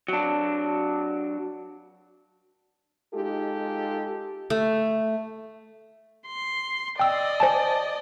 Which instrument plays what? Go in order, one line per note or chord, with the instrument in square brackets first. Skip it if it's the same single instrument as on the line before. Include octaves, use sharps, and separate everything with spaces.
[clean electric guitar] F#3 D4
[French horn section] G#3 D#4 F4 G4 A4
[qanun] A3
[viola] C6
[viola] D5 D#5 [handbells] G5 E6
[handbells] C5 G#5 A5